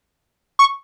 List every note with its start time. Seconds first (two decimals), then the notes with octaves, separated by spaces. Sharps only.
0.59 C#6